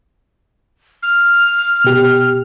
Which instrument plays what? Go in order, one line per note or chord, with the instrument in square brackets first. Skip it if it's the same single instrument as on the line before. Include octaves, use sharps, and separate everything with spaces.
[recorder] F6
[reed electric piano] B2 G4